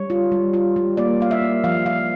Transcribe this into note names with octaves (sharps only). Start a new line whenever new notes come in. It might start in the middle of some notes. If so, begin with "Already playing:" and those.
Already playing: G3 C#5
F4
G3
F4
G3
A#3 D5
A#3 F5
E5
A#3
F3 F5
F3 F5